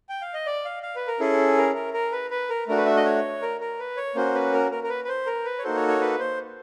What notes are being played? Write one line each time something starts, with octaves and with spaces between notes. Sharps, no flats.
G5
F5
D#5
D5
F5
F5
B4
A#4
C#4 E4 G#4 A4
A#4
A#4
A#4
B4
B4
A#4
A3 D4 F#4 A#4
B4
E5
D#5
C#5
A#4
A#4
B4
C#5
A#3 C#4 F#4 C5
B4
A#4
A#4
A#4
B4
B4
C5
A#4
B4
C#5
A#3 D#4 F#4 A4 C5
C#5
C#5
B4
C5